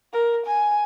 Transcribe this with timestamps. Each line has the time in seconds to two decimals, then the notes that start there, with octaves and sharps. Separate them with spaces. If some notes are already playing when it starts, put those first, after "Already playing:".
0.13 A#4
0.46 G#5